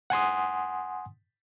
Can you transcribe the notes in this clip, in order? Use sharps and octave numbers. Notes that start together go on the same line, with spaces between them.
F#5 G#5 C6 D#6